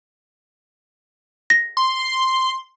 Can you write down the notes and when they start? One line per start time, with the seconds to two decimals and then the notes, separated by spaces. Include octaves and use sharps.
1.50 A#6
1.77 C6